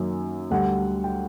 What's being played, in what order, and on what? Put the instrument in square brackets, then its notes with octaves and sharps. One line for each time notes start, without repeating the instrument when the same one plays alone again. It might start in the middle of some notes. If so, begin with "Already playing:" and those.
Already playing: [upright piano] F#2 D#3 F#3 A#3
D2 D3 G3 F#5
G5